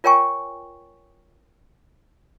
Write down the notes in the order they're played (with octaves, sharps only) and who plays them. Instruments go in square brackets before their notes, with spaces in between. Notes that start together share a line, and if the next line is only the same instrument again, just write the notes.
[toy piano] F4 A#4 C#5 G5 G#5 C#6